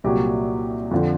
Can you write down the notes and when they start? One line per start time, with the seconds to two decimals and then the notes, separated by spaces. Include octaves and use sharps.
0.04 C2 A#2 F#3 G4
0.91 F2 D3 F3